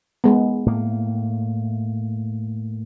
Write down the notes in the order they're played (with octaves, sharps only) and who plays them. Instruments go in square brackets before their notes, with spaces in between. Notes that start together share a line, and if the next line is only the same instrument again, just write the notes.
[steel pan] G#3 B3
[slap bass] A2 A#3